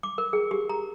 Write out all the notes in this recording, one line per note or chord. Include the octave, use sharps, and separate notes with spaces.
D6
A#4
G#4
G4
A#5